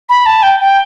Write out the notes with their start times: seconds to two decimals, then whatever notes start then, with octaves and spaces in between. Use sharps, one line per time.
0.09 B5
0.25 A5
0.42 G5
0.60 G5